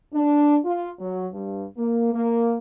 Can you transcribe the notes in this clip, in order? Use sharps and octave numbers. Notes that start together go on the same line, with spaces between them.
D4
F4
F#3
G2
A#3
A#3